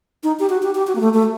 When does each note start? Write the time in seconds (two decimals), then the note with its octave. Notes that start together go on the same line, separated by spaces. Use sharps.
0.23 D#4
0.39 G4
0.49 F#4
0.63 G4
0.75 G4
0.87 F#4
0.95 A#3
1.01 A3
1.14 A3